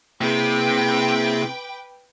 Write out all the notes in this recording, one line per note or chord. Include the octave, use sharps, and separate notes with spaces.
C3 A#3 E4 G#4 B4 G5 D6